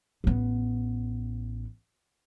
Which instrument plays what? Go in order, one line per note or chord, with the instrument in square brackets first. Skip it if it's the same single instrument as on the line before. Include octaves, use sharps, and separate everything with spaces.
[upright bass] A1 B3